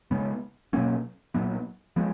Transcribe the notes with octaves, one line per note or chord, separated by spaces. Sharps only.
C#3 G#3 B3
B2 F#3 A#3 C#4
A#2 F#3 B3
F3 G#3 B3